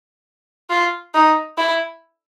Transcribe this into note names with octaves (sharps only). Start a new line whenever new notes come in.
F4
D#4
E4